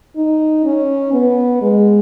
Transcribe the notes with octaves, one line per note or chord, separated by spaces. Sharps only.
D#4
C#4
B3
G#3